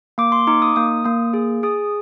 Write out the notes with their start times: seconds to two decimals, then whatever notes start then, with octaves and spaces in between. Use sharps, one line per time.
0.18 A#3 D6
0.32 C6
0.47 D#4 D6
0.62 D#6
0.76 A#3 D#6
1.05 A#3 D#6
1.34 G#4
1.63 G#4 D#6